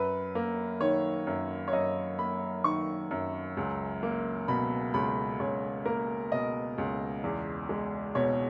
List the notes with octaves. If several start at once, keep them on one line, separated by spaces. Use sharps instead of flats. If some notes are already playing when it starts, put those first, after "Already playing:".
Already playing: F#2 B4
A#3
D#3 C#5
F#2
C#5
F#2 D#5
A#3 B5
D#3 C#6
F#2
C#2
A#3
B2 B5
C#2 B5
C#2 C#5
A#3 A#4
B2 D#5
C#2
E2
G#3
B2 C#5